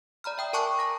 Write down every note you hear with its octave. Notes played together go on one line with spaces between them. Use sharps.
D5 A#5 B5 F6
E5 G5 D#6
A#4 G#5 A5 C#6 D6 F#6
A#5 D#6 A#6